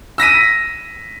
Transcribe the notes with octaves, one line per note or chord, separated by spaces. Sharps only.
E6 A#6 B6 D#7